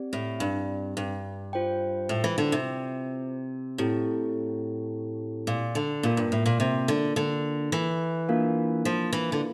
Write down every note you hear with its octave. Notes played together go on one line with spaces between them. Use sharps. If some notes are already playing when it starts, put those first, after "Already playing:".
Already playing: C4 G4 D5
A2
G2
G2
F4 C5 G5
A2
E3
D3
C3
A2 C4 E4 G4
A#2
D3
A#2 A#3 F4 A#4
G2
A2
A#2
C3
D3
D3
E3
A#3 D4 F4 A#4 F5
F3
E3
D3